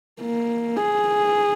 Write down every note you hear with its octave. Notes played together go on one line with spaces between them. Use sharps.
A#3
G#4